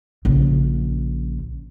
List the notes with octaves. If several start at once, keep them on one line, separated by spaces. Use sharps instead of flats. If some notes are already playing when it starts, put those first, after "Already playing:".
A#1 C#3